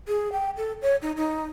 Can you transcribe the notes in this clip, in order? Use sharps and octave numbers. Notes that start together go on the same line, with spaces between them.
G#4
G5
A4
C#5
D#4
D#4